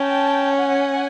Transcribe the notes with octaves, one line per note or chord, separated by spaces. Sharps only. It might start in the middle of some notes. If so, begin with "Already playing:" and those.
Already playing: C#4 G5 A5
F#5 G#5